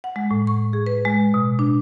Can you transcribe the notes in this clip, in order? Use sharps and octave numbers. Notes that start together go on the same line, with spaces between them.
F#5
G#3
A2
C#6
G#4
B4
G#3
B2
D4